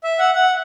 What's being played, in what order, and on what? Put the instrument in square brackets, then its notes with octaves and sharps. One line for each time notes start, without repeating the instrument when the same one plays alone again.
[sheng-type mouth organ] E5
F#5
F#5